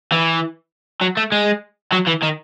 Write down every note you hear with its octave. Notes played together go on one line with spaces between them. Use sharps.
E3
F#3
A3
G#3
F#3
E3
D#3